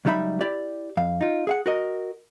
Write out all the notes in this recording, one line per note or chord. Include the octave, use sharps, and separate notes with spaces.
C#2 F#3 G3 D#4 E5 B5
E4 G4 D5
F2 F5
D#4 F4
G#4 F5 F#5
F#4 A#4 D#5